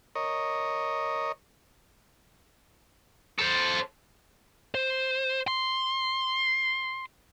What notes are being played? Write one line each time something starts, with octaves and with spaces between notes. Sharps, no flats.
A#4 C#5 D#5
A4 C5
C5
C6